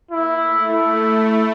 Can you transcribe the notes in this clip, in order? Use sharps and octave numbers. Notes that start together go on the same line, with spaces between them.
A#3 E4
A3
E4